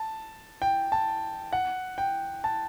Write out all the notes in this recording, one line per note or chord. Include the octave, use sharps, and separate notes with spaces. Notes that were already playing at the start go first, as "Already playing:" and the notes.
Already playing: A5
G5
A5
F#5
G5
A5